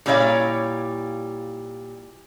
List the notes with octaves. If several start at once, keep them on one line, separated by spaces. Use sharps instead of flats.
A#2 G3 E4 C#5 D5 F5